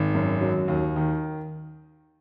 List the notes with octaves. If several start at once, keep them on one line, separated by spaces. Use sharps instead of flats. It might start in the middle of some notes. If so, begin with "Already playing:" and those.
Already playing: G#1
F#2
F#3
D#2
D#3